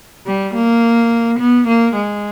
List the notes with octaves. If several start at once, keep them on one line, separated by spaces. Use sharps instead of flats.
G3
A#3
B3
A#3
G#3